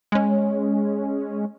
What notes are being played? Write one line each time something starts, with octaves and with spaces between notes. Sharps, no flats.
G#3 C#4